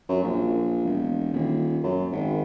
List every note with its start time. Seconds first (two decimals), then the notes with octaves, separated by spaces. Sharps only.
0.09 F#2
0.23 A#1
0.84 E1
1.33 D#1
1.83 F#2
2.12 G#1